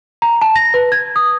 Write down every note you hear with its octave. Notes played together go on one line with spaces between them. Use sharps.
A#5
A5
A#6
B4
G#6
D#6